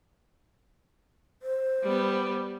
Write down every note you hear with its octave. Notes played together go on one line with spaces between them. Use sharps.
C5
G3 B3